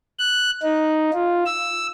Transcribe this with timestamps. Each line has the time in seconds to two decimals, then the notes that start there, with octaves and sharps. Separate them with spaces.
0.19 F#6
0.62 D#4
1.13 F4
1.46 E6